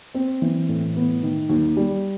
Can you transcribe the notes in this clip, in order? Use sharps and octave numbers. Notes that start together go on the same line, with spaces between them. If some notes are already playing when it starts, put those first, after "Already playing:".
C4
E3
A2
B3
D#3
D#2
G3